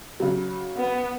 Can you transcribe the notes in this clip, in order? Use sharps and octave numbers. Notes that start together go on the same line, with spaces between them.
C#3 F#3
B3